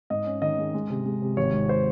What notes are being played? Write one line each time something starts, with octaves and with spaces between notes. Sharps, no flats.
G#2 D#5
C#4
D#3 D#5
G#3
G#3
C3
G#3
C3
G#1 C#5
G#2
C5